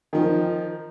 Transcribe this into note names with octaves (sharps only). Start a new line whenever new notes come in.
D#3 F3